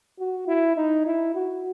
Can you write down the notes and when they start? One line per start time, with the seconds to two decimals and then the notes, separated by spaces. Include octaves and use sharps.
0.19 F#4
0.48 E4
0.76 D#4
1.06 E4
1.34 F#4